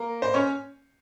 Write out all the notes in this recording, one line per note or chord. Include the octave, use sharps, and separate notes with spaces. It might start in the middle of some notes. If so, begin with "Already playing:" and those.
Already playing: A#3 A#4
C5
C#4 C#5